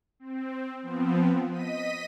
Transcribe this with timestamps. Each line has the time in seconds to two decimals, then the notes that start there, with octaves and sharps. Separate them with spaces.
0.20 C4
0.83 F3 B3 C4
1.50 D#5 B6 D#7